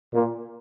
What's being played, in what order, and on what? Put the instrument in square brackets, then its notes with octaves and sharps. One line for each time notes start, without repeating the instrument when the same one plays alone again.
[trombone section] A#2